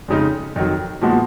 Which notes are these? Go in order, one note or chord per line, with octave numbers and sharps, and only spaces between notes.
F2 C#3 G#3 D#4
F2 D#3 F#3
A#2 F3 G#3 B3 F#4